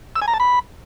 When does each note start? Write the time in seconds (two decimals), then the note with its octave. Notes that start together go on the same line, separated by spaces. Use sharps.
0.16 E6
0.22 G#5
0.28 A#5
0.34 A5
0.40 B5